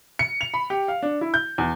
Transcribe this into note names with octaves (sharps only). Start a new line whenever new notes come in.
C#7
F7
B5
G4
F5
D4
E4
G6
E2